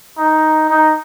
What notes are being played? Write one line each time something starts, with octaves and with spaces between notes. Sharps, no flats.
D#4
D#4